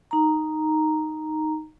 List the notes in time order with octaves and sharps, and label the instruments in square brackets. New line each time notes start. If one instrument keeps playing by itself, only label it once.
[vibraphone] D#4 A#5